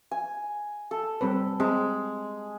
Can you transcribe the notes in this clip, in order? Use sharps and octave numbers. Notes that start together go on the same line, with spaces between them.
G#5
A4
G3 C4 B4
G#3 C4 G#4